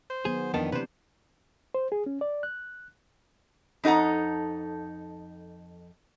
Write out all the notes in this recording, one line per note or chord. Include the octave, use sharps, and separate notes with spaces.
C5
D#3 F#3 B3 G#4
F2 D#3 E3 A#3 B3 D4 A5
C3 D4 B4 C5 D5
C5
G#4
C#4
D5
F#6
F2 D#4 A4 F#5 A#5